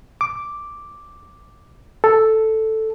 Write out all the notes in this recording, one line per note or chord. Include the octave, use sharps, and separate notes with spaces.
D6
A4